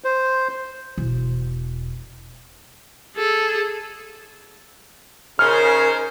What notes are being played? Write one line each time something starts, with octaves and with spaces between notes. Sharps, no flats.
C5
E1
G#4 A4
C#3 C#4 D#4 A#4 C5 F6